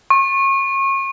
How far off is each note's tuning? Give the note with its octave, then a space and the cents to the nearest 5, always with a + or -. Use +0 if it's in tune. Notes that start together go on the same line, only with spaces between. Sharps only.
C#6 -35